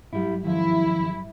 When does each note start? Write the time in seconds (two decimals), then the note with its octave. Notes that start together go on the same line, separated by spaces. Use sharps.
0.13 G#2 F#3 G3 E4 G4
0.44 D#2 F3 E4